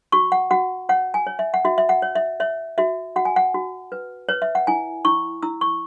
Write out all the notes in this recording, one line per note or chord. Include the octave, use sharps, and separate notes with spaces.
F#4 C#6
F#5
F#4 F#5
C#5 F#5
G#5
C#5
E5
F#5
F#4 E5
E5
F#5
C#5
E5
C#5 E5
F#4 E5
F#4 F#5
G#5
F#5
F#4
B4
B4 C#5
E5
F#5
E4 G#5
E4 C#6
E4 E6
C#6